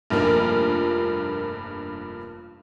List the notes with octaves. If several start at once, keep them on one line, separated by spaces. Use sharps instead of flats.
F1 G2 F3 A#3 F4 A#4